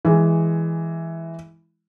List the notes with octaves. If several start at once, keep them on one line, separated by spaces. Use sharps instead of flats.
E3 G#3